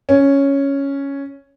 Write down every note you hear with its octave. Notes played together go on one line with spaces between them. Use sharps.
C#4